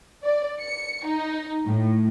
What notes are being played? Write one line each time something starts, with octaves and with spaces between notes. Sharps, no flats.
D5
C#7
D#4
A2